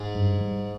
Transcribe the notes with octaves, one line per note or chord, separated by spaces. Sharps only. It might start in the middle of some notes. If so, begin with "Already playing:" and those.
Already playing: G#2 G#3
G2
G3